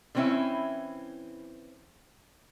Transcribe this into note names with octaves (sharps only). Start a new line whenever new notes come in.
D3 E3 C4 C#4 E4 E5